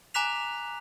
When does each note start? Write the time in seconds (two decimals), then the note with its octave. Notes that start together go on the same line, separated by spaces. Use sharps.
0.14 G#5 A#5 D6 F#6 B6 F7